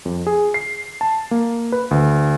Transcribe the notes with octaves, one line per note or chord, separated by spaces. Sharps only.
F2
G#4
C7
A5
A#3
B4
D2